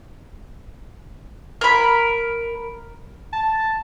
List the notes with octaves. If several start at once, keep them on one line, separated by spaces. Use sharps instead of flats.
A#4 B5
A5